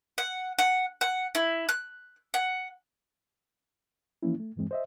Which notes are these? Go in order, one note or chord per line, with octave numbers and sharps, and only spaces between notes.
F#5
F#5
F#5
E4
F#6
F#5
E3 F3 A#3 C#4 E4
A3
E2 G2 E3 G#3 C4
C5 D#5 E5